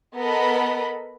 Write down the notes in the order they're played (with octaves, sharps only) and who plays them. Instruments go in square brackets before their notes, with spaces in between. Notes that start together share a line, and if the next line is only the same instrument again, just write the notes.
[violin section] B3 A4 A#4 D#5 B5